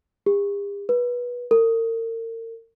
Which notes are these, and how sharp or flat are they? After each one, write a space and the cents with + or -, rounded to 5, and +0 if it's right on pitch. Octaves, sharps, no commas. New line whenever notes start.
G4 +45
B4 -20
A#4 -40